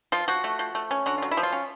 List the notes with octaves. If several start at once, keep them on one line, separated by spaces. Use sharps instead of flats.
F3 F4
F3 F#4
A3
F3
A3
C#4
D3 F#4
F#3 F4
E4
F3
F4
C#4